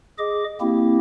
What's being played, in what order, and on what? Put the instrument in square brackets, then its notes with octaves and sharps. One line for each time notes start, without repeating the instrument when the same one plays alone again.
[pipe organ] G#4 D#5 D6
A#3 C4 E4 G4